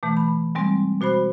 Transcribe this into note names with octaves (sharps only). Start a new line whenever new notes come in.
B2 E3 A3
B5
G3 G#3 C4
B2 F#4 C5 B5